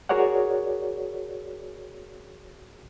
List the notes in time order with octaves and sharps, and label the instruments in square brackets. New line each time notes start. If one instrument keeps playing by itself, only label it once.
[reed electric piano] F#4 G#4 A#4 C#5 D5 F#5